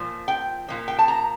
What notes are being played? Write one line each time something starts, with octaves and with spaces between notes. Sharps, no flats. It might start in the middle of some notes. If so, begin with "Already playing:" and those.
Already playing: A#2 F3
G5
A#2 F3
G5
A5
A#5